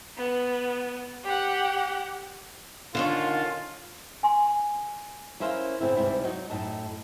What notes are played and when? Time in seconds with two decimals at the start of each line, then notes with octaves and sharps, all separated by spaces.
0.17 B3
1.24 G4 F#5
2.95 D3 D#3 C#4 F4
4.23 G#5 C6
5.40 C#4 E4 A#4 C5 F5
5.80 A2 C#3 A3 B3 C4 E4
5.97 D2 G#2 C3 G3 E4 B4
6.24 F#3 D#4 F#4
6.50 F#2 A2 D#4 A5